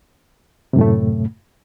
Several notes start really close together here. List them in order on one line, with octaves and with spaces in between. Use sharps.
C3 F#2 A2 A3